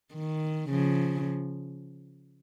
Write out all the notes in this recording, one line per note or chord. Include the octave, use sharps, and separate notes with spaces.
D#3
C#3 F3